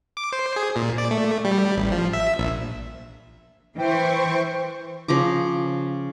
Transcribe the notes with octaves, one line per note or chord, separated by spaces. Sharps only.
D6
C5
G#4
A#2
D5
A3
G3
A1
F3
E5
A#1
E3 C5 G5 C#6
C#3 F3 A#5 D6